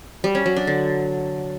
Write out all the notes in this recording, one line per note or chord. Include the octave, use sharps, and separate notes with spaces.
G3
C#4
F#3
D4
D3